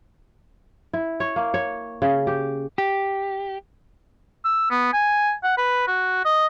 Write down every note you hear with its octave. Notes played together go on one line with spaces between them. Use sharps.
E4
C#5
A#3
C#5
C#3
G4
G4
E6
B3
G#5
F#5
B4
F#4
D#5